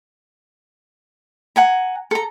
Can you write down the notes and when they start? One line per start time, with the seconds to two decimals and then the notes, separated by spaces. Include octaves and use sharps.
1.56 F#5 G#5 A#5
2.11 A4 A#5